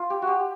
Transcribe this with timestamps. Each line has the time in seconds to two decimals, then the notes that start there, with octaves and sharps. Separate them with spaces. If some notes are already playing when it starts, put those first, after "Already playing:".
Already playing: F4
0.10 G4
0.22 F#4
0.27 G4